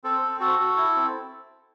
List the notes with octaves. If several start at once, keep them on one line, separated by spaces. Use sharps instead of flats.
C4 A4
C4
F#4 A4
F#4
E4
C4